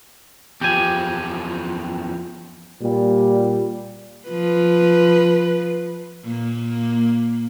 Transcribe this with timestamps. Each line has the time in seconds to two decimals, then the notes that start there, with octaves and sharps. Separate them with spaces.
0.61 E2 F3 G4 G#5
2.82 A#2 G3
4.28 F3 B4
6.24 A#2 A#3